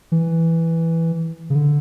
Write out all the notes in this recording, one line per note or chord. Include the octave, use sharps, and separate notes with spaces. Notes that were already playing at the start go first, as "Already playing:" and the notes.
E3
C#3
D3